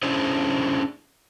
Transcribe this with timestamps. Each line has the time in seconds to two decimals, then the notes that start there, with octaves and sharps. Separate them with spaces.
0.03 C#4 D4 E4 G#4 C5